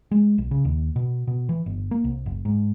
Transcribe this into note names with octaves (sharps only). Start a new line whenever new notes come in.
G#3
B1
C#3
D#2
B2
B2
E3
G1
A#3
C2
F#1
G#2